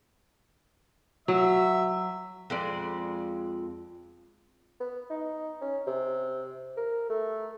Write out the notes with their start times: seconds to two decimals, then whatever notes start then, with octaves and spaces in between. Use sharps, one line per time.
1.28 F#3 E5
2.50 F2 G#3 D5
4.80 B3
5.10 D#4
5.61 C#4
5.87 C3
6.77 A#4
7.10 A3